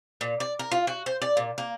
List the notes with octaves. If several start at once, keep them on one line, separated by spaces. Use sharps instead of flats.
A#2
D5
A#4
F4
F#4
C5
D5
A#2
A#3